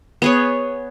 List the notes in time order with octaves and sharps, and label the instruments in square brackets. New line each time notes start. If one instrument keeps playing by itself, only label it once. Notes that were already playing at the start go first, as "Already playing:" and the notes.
[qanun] B3 G#4 C#5